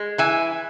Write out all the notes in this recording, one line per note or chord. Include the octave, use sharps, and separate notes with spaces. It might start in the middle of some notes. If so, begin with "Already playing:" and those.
Already playing: G#3
E3 E5 G#5